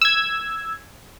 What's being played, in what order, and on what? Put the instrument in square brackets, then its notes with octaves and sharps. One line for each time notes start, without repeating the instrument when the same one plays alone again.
[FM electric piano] E6 G#6